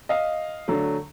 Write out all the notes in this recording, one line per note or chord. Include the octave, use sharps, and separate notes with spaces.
D#5 F5
D3 F#3 A3